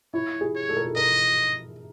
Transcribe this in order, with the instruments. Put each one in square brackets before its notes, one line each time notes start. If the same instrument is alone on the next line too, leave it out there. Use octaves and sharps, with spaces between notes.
[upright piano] E4 [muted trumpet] C#5
[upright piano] G#4
[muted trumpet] C#5
[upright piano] A4
A#4
A4
[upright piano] A#4 [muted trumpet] D#5